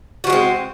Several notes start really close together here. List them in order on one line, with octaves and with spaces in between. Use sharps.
F#4 F3 G#3 C4